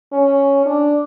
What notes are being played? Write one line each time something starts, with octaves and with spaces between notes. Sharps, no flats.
C#4
D4